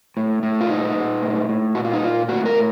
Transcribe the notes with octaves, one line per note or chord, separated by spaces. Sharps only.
A2
A2
F4
A#2 D#4
A#2
A2
A2
A#2 F#4
F4
D#4
A#2 F4
A2 F#4
A#4
A2